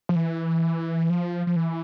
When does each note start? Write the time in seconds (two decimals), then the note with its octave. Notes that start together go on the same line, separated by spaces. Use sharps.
0.09 F3
0.16 E3
1.10 F3
1.47 F3
1.56 E3